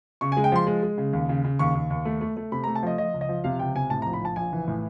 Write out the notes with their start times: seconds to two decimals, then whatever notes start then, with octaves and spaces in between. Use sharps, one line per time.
0.21 C#3 C#6
0.32 G#5
0.37 G#3
0.44 G5
0.52 F3 C6
0.67 G#3
0.83 G#3
0.98 C#3
1.13 D#2
1.29 C#3
1.44 C#3
1.59 D#2 C#6
1.75 D#2
1.90 D#2
2.05 A3
2.21 A3
2.37 A3
2.52 C3 B5
2.64 A#5
2.67 A3
2.75 A5
2.83 F3 D#5
2.98 F3 D#5
3.14 C#2
3.21 D#5
3.29 F3
3.44 C3 F5
3.59 C#2 G5
3.75 C3 G#5
3.90 A2 A5
4.02 A#5
4.06 A#1
4.13 B5
4.22 A#1 A5
4.36 A#1 G#5
4.52 E3
4.68 A2